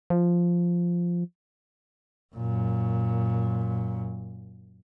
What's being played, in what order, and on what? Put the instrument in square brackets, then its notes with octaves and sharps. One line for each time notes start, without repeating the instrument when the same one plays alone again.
[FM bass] F3
[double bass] F#2 A#2